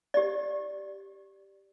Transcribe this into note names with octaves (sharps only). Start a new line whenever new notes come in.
G4 D5